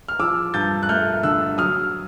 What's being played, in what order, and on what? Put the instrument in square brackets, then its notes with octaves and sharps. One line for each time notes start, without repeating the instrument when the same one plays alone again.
[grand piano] F6
F3 D6 E6
G2 G6 A6
F#6
A3 F6 G6
D3 E6 F#6
F#3 D#6 F6